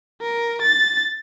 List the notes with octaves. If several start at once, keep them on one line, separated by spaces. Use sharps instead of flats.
A#4
A6